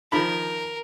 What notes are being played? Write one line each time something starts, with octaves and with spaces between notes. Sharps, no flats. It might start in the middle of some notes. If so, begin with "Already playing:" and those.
D#3 F3 A#4 B5